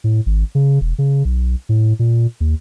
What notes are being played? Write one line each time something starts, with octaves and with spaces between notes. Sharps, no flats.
A2
G#1
C#3
E1
C#3
B1
A2
A#2
D#2